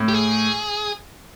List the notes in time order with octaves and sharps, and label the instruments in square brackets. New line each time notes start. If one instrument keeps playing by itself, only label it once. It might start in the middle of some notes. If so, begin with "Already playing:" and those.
Already playing: [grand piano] A2
[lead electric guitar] G4
G#4